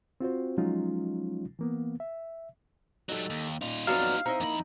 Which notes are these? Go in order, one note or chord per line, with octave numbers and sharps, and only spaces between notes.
C4 F4 F#4 C5
F3 F#3 G#3 C#4 D#4 F4
E3 A#3 B3
E5
F#3 G3 D#4 A4
D#2
A#2 D#4 F4
F2 F#3 B3 D5 F5 A5
C4 D#4 E4 D#5
F2 A#3 B5